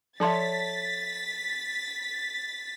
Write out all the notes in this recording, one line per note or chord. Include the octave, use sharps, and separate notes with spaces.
F3 A4 C#5 E5 A5 C6 A6 B6